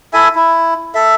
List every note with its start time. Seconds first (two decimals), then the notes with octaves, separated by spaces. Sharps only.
0.13 E4 A4 E5 G#5
0.35 E4
0.95 A4 E5